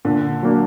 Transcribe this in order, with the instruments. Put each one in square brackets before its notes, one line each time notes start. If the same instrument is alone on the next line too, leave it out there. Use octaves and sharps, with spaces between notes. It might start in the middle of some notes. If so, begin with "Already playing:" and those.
[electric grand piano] A#2 [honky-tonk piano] D3
[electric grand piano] F#3 A#3 D4